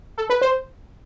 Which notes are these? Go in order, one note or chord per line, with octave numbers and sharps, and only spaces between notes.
A4
B4
C5